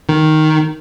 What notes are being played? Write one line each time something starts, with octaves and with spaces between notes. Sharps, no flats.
D#3